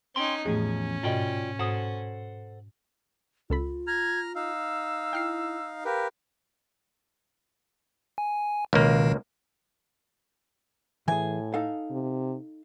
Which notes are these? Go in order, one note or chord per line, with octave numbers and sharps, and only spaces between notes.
C#4 D#4 G5 C6
E2 A2 F3 A3 C#4 G#4
G#2 B2 F4 D5 D#5 G5
G#2 A4 C5 F#5 D#6
C#2 F4 A4 B5
A#5 F6 G#6
D#4 F5 E6
E4 G5 F6 C7
G4 A#4 B4 F5
G#5
C#2 B2 D#3 A#3
A2 E3 G#4 G#5
D#4 A4 F5
C3